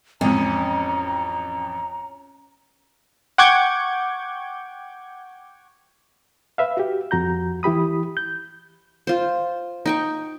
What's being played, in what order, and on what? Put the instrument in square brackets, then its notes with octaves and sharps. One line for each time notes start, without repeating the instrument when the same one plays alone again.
[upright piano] A1 F2 [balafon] G#3 C4 [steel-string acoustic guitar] C#4 [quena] A#5
[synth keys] F#5 G5 C#6 D6 G6 G#6
[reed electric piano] B4 E5 F5
F#4 G4
F2 F#4 A#5 G6
E3 E4 G4 B5 D#6
G6
[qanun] F4 C5
D#4 G5 C#6